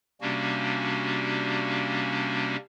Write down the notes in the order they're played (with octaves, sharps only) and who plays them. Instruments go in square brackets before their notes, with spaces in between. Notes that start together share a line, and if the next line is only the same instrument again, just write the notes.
[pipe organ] C3 G3 A#3 C#4 D4 F#4